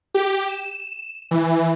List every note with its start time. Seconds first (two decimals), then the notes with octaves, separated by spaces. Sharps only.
0.14 G4
0.49 E7
1.31 E3